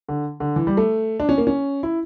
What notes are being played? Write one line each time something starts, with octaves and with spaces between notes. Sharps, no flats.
D3
D3
E3
G3
A3
D4
C#4
A#3
C#4
E4